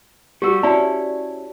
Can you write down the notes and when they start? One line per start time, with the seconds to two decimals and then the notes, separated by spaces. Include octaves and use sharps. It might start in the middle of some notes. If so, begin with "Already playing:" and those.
0.42 G3 F#4 G4 E6
0.63 C#4 E4 F#4 D5 A5